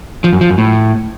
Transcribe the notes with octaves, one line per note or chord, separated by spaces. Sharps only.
F3
F#2
F3
F#2
A2